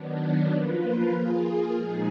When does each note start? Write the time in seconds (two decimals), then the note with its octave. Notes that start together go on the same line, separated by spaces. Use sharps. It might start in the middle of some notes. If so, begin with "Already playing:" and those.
Already playing: D#3 F#3 B3 D4
0.52 F3 A#3 F4 B4
1.14 A#3 F4 G#4
1.76 A#2 F3 G#3 D#4 G#4